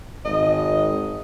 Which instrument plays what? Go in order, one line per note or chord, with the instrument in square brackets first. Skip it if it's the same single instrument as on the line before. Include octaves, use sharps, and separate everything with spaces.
[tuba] G#1 [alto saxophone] D#5